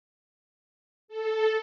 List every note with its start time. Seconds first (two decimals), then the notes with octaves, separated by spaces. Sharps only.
1.08 A4